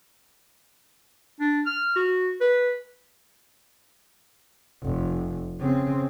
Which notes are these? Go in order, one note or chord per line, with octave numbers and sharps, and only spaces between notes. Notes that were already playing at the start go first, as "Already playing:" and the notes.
D4
F6
F#4
B4
F1
C#3 C4